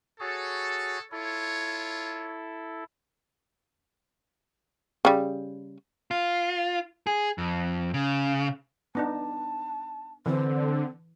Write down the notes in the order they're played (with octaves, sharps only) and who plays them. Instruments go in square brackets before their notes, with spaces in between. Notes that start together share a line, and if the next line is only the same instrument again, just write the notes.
[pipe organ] F#4 G#4 C#5 [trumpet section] A4
[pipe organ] E4 A4 [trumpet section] F4 C#5
[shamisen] C#3 G3
[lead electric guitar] F4
G#4
F2
C#3
[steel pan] B3 D4 D#4 [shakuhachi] A5
[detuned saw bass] D3 [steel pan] E3 [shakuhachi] C4